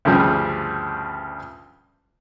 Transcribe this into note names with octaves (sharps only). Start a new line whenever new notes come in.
D2 G2 C#3 F3 G3